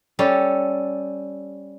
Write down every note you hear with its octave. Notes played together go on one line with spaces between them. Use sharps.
G3 C#4 G4 A4